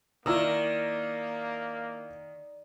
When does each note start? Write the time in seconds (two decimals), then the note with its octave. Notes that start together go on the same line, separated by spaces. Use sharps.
0.26 D#3 A#3 E4 D5 A#5 D#6 E6